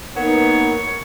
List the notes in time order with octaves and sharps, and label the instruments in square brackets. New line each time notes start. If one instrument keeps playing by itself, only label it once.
[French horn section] A#3 B3 [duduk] D#4 [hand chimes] A#4 F#5 [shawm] C#5